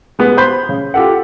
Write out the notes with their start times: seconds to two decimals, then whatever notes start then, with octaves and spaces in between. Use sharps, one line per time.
0.19 G#3 B3
0.37 C5 B5 C6 G6
0.69 C#3
0.94 F4 G4 A4 F#5